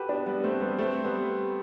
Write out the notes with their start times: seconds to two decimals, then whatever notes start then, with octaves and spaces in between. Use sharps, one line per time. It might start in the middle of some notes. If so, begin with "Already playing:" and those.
Already playing: F#4 G4 A4 B4
0.09 B3 D4
0.27 G3 B3
0.44 A3 C4
0.61 G3 B3
0.79 A3 C4
1.04 G3 B3